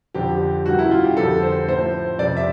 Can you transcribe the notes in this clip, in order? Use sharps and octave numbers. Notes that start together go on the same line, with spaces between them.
F2 D3 F3 G4
G2 D#3 F#4
E4
F4
G4
F2 D3 F3 A4
C5
A2 F3 C5
F2 C3 F3 D5
E5